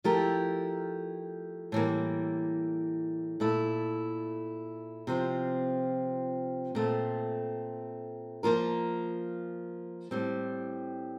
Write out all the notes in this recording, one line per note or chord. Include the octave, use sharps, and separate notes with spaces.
F3 A3 E4 G4 A#4
A2 E3 G3 A#3
A#2 A3 E4
C3 F3 C4 F4
A#2 A3 C4
F3 A#3 F4 A#4
A2 G3 C4